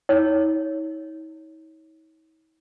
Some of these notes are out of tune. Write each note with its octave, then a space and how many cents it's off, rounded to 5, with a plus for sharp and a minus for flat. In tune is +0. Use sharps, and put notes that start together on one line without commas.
D#4 +45 C#5 +0